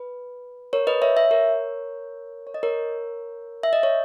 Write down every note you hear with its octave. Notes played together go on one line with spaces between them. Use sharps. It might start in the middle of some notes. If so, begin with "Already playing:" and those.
Already playing: B4
A#4 C#5
B4 D#5
C#5 E5
C#5 E5
A#4 C#5
C#5
D#5
A#4 C#5
E5
D#5
C#5